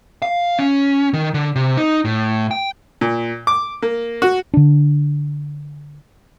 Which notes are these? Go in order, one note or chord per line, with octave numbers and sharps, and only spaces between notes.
F5
C#4
D#3
D3
C3
D#4
A2
G5
A#2
D6
A#3
F#4
D3 D4